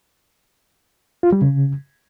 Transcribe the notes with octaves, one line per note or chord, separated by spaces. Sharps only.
F4
G3
C#3